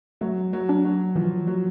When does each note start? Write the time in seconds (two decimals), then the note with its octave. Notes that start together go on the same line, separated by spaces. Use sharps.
0.21 F#3 A3
0.53 F#3
0.69 D4
0.84 F#3
1.16 E3 F3
1.47 F#3